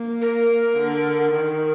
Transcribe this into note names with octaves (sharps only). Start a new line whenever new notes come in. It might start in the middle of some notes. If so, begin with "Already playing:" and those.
Already playing: A#3
A#4
D3
D#3